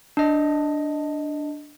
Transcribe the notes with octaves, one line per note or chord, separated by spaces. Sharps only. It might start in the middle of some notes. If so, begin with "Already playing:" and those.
D4 D#5